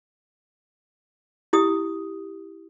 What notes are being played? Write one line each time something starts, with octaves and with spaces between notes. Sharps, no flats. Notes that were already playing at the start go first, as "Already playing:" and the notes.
E4 G4 D#6